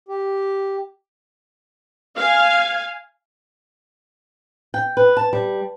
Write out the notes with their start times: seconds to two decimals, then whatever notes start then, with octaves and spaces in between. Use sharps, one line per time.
0.08 G4
2.18 F5 G#5
4.74 G5
4.97 B4
5.17 A5
5.33 G3